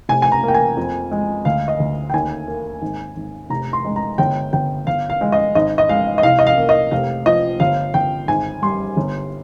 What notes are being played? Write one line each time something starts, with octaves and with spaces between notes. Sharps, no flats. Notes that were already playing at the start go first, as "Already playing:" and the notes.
F1 G#5
G#5
A#5
A#3 G5
G#5
F2
G#3
D2 F5
D#5
D2
G5
D#2 G#5
A#3
G#1
G#1
F1 A#5
C6
G#3
A#5
G1 G5
G1 G5
G1 F5
F5
G#3
D#5
G#1 D#5
D#5
G#3 F5
D#5
C2 F5
D#5
F5
A#3
D#5
F1 F5
F3 D#5
G1 F5
G1 G5
G#1 G#5
G3 C6
G1